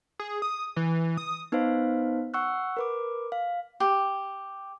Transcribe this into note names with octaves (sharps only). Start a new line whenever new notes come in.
G#4
D#6
E3
D#6
B3 D#4 B4 C5 F5
F#5 C#6 E6 F#6
A#4 B4 D6
F5
G4